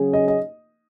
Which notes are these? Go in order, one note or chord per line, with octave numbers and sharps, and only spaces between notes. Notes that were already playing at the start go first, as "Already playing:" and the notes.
Already playing: C#3 F#3 C#4 G#4
D#5
D#5